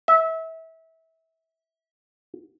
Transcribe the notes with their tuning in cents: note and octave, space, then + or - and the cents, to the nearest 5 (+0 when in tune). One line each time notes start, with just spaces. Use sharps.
E5 -25